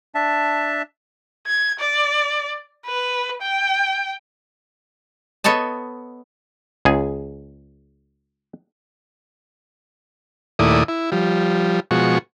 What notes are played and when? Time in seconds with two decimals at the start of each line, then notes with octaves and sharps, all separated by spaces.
0.15 D4 E5 A5
1.47 G#6
1.80 D5
2.86 B4
3.42 G5
5.44 B3 A4 C#5 D#5 A5
6.85 C#2 G#4
10.59 D#2 A#2 A3 E4 D5 D#6
10.88 E4
11.12 F3 G3
11.91 B2 F3 G#3 F#4 C#6